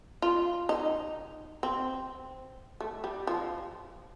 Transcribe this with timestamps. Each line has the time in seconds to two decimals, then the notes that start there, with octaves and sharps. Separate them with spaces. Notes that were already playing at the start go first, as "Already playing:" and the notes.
0.22 F4
0.69 D#4
1.63 C4
2.80 A3
3.04 G3
3.27 F3